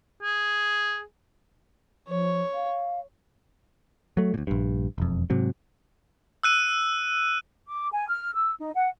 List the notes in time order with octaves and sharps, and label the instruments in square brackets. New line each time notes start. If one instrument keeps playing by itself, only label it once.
[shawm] G#4
[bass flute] F3 [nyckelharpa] C#5
[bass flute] F5
[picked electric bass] F#3 A3
D2 A#2
A#1 G2
E1 F2
G#2 C3 F#3
[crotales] E6 F#6 D#7
[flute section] D6
G#5
F6
E6
D#4
F#5